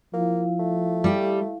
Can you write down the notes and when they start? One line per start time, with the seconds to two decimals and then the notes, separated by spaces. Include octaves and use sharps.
0.14 F3 A#3 E4 F5
0.59 A3
1.04 G3 G4